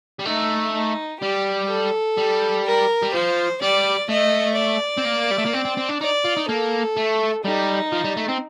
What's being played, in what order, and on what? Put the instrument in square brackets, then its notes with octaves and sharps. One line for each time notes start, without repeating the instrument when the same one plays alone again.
[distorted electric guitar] G3
[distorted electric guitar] A3 [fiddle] D#4
[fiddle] D#4
[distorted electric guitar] G3 [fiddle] G4
[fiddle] A4
[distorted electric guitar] G3
[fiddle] A#4
[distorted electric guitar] G3
[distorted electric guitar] F3 [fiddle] C5
[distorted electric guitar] G3 [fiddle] D5
[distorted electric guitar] A3 [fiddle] D#5
[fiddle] D5
[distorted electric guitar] C4
A#3
G3
A3
A#3
C4
C4
C4
D4
[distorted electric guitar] D#4 [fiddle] D5
[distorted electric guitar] F4
D#4
[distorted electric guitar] A#3 [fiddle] A4
[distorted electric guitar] A3
[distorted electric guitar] G3 [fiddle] D#4
[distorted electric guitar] F3
G3
A3
C4